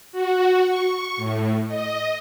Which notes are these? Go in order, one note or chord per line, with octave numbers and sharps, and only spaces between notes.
F#4
C#6
A2
D#5